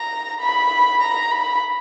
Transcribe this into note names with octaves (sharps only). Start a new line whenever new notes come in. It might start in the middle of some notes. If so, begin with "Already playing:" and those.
Already playing: A#5
B5
A#5
B5